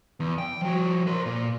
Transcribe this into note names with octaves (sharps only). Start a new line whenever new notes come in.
E2
G5
F3 F#4
A#4 C5
A#2